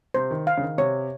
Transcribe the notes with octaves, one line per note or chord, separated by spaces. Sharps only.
C3 C5
D#3
F5
C#3
D#3
C3 C#5